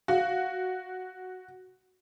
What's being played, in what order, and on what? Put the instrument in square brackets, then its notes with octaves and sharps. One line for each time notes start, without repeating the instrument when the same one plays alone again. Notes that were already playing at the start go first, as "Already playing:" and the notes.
[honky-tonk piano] F#4 [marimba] F5